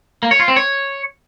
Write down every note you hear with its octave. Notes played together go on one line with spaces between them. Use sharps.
A#3
C#5
F4
C4
C#5